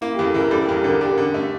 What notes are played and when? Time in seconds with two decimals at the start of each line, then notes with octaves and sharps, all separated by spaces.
0.01 A#3 E4
0.14 E2 G4
0.26 A4
0.34 E3 A#4
0.51 G3 A4
0.64 G4
0.69 E2
0.76 G4
0.84 D3 A#4
1.01 D4 G4
1.18 D3
1.34 A3